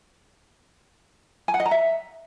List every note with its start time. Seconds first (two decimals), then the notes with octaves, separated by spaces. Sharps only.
1.48 G#5
1.54 F#5
1.60 D#5
1.66 A#5
1.71 E5